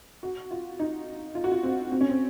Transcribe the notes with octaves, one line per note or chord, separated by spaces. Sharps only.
F#4
F4
D#4
F4
F#4
F4
C4
C4
C#4
C4